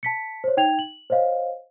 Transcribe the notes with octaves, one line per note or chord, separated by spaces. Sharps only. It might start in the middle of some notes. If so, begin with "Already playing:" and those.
A5 B6 C#7
C5 C#5
D#4 G5 G#6 F7
F#7
C5 C#5 D#5 F5